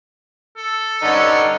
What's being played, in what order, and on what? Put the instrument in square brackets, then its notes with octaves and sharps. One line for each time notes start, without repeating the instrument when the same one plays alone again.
[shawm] A4
[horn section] G2 D3 C#4 [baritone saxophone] D#4